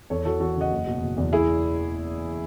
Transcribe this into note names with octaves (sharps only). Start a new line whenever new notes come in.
E2 A4 C#5
E3 F#4 A4
E2 F#4 A4
C#3 D#5 F#5
F#1
B2
F#1
E2
E4 G#4